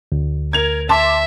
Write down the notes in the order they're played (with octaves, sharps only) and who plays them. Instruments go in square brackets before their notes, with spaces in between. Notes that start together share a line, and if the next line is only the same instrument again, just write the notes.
[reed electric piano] D2
[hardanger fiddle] A#4 [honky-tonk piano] G#6 F7
[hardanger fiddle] E5 [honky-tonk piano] A5 C6 D6